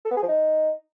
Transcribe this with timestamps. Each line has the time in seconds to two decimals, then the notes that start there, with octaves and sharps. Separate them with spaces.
0.05 A4
0.11 B3
0.17 G#4
0.23 F3
0.28 D#4